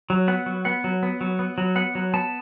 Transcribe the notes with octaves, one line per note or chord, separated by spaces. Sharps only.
F#3
B3 F#5
F#3
B3 F#5
F#3
B3
F#3
B3
F#3
B3 F#5
F#3
B3 A5